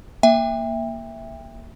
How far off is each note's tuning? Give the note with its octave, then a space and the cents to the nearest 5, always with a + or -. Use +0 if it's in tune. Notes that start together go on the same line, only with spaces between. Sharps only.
A#3 +0 E5 +0 G5 +30